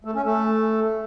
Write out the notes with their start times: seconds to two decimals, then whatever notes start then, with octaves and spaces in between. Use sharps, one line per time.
0.05 A3
0.15 C#4
0.25 A3